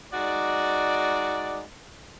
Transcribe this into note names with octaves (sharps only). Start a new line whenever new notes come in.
G#3 D#4 F#4 D5